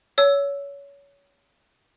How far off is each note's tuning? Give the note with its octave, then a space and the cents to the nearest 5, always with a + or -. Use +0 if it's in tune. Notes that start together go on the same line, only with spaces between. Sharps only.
C#5 +25 E6 +0